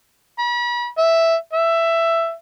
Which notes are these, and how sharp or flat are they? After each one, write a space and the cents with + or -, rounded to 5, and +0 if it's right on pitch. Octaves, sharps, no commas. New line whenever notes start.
B5 -40
E5 +0
E5 +10